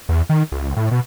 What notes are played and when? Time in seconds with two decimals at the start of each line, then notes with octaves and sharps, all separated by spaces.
0.09 E2
0.29 D#3
0.52 C#2
0.77 A2
0.91 B2